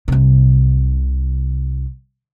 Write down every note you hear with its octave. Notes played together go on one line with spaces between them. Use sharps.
C2 C3